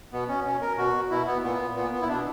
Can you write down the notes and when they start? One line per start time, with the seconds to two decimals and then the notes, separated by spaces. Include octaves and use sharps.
0.12 B2 B3
0.29 C#4
0.45 B2 C#4
0.61 A#4
0.78 B2 F#4
1.11 B2 E4
1.27 B3
1.43 A#2 B3
1.76 A#2 B3
1.93 B3
2.02 E4
2.09 B2 D4